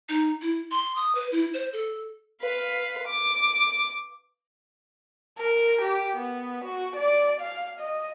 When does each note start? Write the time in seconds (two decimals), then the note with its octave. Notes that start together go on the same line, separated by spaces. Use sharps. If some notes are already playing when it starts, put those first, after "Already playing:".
0.09 D#4
0.42 E4
0.71 C6
0.96 D#6
1.15 B4
1.32 E4
1.54 C5
1.73 A4
2.42 B4 F5
3.07 D6
5.38 A#4
5.82 G4
6.16 B3
6.65 F#4
6.96 D5
7.41 F5
7.80 D#5